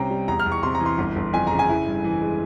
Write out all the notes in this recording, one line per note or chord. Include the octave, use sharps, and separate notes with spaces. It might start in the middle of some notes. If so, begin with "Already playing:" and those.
Already playing: C2 C3 C#4 G5 A#5
G3
E2 A#5
F6
E2
C#6
C3 C6
A#5
E3
C6
G1
G1
F2 G#5
C#3 A#5
G#5
E4
G2
E3
G#3